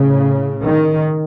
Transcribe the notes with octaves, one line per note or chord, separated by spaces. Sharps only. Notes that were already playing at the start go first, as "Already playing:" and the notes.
Already playing: A2 C#3
D#3